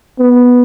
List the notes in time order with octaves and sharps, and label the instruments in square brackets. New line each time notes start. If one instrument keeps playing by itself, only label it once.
[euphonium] B3